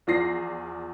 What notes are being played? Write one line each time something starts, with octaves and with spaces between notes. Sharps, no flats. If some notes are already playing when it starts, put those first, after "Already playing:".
E2 F3 D5 A#6 C7